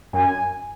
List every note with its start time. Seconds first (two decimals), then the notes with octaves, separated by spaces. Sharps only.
0.13 F#2 G#5